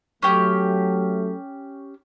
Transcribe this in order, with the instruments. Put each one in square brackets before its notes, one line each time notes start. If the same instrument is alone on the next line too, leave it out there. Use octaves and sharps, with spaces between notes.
[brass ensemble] F#3 A3 [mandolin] C#4 G4